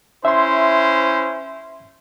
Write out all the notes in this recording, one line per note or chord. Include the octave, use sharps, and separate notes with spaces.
C#4 E4 C5 E5 C6